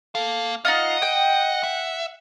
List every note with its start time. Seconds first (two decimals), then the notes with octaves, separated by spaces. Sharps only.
0.15 A#3 A4 F5
0.65 D#4 F4 D#5 F5 F#5
1.02 G5
1.64 E5